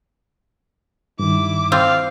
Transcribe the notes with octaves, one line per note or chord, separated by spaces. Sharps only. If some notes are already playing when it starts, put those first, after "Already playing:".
G2 D#3 E4 D6
C4 F4 F5